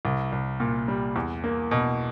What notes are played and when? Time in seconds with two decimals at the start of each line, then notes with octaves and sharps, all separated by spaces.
0.05 C2
0.32 C2
0.60 A#2
0.88 G3
1.16 E2
1.44 A#3
1.71 B2